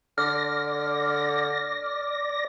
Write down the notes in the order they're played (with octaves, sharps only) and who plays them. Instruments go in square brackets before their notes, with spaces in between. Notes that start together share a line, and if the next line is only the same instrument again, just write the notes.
[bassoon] D3 [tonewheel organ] D5 A#6 [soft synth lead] F6